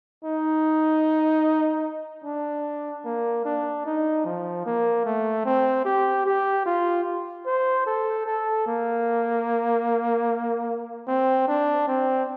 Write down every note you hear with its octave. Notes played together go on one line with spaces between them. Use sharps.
D#4
D4
A#3
D4
D#4
F3
A#3
A3
C4
G4
G4
F4
C5
A4
A4
A#3
C4
D4
C4